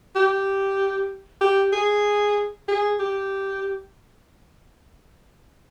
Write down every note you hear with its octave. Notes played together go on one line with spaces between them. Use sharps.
G4
G4
G#4
G#4
G4